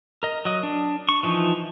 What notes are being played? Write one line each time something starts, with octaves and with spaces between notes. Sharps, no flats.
A#4 D#5
F#3 D#5
D4
C#6
E3 F3 D#4